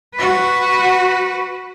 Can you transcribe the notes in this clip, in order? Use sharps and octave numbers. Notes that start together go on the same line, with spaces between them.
F#4 B4